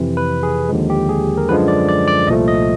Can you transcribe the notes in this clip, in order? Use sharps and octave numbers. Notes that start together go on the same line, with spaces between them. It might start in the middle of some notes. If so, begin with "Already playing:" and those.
Already playing: F2 C3 E3
B4
G#4
D#2 D3 F3 G#3
G4
G#4
A#4
F#2 D3 F3 G#3 B4
D5
D5
D5
C2 A#2 F3 A3 D#5
D#5